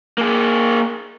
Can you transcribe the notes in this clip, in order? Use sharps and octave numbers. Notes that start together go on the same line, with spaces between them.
A#3 G#4